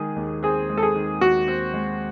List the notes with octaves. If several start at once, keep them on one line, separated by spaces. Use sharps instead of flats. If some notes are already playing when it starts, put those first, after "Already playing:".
Already playing: D#3 G#3 G#4
D#2
C4 G#4
G#3
A4
G#4
D#3
D#2 F#4
C4
G#3